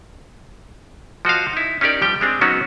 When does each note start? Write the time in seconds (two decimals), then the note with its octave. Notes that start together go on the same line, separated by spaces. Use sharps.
1.25 F3 F#4 D#5 F5
1.53 D#4 E4
1.81 C#4 D#4 G4 A#4 D5
2.01 F3 G3 G4 G5
2.21 G#3 C4 D4
2.41 F#3 B3 C#4 D#4 F#4